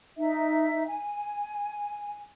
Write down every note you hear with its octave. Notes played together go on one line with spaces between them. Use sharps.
D#4 E5
G#5